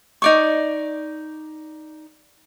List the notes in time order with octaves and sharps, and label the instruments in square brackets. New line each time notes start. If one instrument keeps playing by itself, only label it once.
[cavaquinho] D#4 D5 C#6